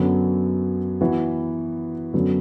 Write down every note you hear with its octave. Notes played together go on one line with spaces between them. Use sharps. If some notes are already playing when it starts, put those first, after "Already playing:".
Already playing: F#2 D3 F#3 B3
E3 B3 F#4
F#2 D3 F#3 B3